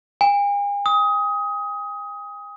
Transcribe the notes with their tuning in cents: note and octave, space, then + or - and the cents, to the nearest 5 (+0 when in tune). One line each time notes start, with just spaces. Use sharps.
G#5 -45
D#6 +20